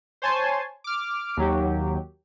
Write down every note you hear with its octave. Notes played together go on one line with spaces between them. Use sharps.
C5 C#5 G#5 A5 C6
D6 F6
D#2 F#3 G4